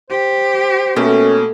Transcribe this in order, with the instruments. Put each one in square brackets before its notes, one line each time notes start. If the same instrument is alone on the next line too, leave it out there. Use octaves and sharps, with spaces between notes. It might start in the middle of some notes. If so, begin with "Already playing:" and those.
[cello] G4 [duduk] C5
[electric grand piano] B2 A#3 [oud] A3 [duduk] C#4